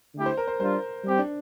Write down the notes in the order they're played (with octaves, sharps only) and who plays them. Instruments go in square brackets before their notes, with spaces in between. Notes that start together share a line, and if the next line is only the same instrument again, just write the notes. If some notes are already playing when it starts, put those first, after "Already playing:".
[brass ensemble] D3 A3 E4 G4
[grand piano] C5
A#4
C5
[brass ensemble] G3 D4 F4 [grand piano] C5
[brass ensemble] G3 C4 G4
[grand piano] D4